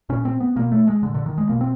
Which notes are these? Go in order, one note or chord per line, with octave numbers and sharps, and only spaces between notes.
A#2 C#4
C4
B3
B2 A#3
A3
G#3
A#2 D3
D3
D#3
G#3
B2 A#3
C4